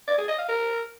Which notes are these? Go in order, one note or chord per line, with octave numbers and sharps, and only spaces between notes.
D5
G#4
D#5
F5
A#4